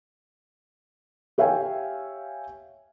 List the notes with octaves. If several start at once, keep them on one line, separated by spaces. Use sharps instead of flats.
G4 C#5 E5 F5 G5 G#5